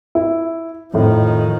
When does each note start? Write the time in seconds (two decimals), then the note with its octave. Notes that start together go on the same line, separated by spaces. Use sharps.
0.15 E4
0.94 F2 A2 D#3 F3